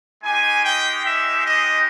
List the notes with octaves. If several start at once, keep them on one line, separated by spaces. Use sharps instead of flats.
G#3 D#4 G4 G#5
G5
E5
D#5